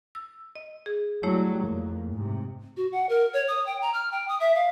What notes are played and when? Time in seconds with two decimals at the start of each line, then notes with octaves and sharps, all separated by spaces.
0.15 E6
0.56 D#5
0.86 G#4
1.23 F#3 G3 A3 E4 C#5
1.62 F2 A#3
2.11 G#2 C3
2.77 F#4
2.92 F#5
3.09 A#4
3.33 C#5
3.48 D#6
3.66 G5
3.82 A#5
3.94 F6
4.12 G5
4.28 D#6
4.40 E5
4.55 F5